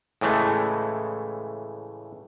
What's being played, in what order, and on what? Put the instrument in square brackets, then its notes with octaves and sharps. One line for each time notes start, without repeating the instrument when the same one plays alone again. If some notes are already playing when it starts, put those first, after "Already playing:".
[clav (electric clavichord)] A2 C#3 E3 G#3 A3